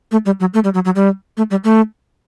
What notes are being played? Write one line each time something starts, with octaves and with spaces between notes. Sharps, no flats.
A3
G3
F#3
A3
G3
F#3
F#3
G3
A3
G3
A3